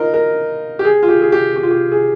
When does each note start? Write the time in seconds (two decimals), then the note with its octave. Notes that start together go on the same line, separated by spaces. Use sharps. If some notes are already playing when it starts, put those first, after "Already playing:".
Already playing: D#4 F4 A#4
0.14 A#4
0.79 G4
0.85 G#4
1.03 F4
1.08 G4
1.22 G#4
1.32 G4
1.56 G4
1.63 F4
1.71 G4
1.92 G#4